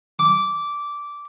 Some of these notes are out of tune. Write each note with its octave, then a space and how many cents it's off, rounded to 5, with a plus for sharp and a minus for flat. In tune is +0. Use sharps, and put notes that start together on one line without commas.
D6 -10